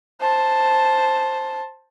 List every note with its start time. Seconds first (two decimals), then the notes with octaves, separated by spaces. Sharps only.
0.21 C5 A5